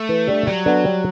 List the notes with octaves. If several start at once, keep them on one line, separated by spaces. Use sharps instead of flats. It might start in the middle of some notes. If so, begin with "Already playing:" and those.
Already playing: A3
E3
G3 D4 G4
F#3 G3
B3 D4 A4
G3